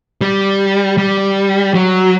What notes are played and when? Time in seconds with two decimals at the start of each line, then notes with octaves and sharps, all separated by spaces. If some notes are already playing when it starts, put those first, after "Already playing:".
0.21 G3
0.98 G3
1.74 F#3